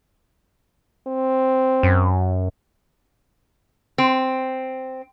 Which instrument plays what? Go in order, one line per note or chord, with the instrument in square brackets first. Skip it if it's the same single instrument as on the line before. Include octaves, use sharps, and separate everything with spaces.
[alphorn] C4
[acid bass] F#2
[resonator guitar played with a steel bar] C4